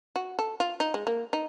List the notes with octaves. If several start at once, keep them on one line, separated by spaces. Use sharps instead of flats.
F#4
A4
F4
D#4
G#3
A#3
D#4